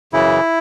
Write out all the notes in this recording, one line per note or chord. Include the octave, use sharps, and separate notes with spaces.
F#2 C#3 E3 E4